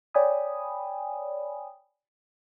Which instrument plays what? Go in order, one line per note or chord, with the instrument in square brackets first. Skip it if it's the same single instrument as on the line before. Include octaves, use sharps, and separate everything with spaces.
[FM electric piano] C#5 D5 G5 G#5 B5 D#6